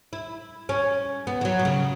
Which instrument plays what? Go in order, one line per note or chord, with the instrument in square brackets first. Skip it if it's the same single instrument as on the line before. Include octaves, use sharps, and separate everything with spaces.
[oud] E4
C#4
B3
E3
F#3
B2
C#3